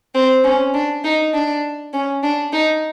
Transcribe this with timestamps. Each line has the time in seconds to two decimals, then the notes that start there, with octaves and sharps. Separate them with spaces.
0.15 C4
0.44 C#4
0.74 D4
1.04 D#4
1.34 D4
1.94 C#4
2.23 D4
2.53 D#4